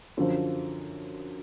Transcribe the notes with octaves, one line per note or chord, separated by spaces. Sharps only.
F#2 D3 F3